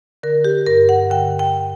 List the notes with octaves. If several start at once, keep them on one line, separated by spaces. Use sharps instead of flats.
D3 A#4
G4
G2 A#4
F#5
D3 G5
G5